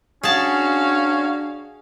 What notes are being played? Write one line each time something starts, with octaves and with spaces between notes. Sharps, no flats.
C#4 D4 F#4 G#4 F5 A5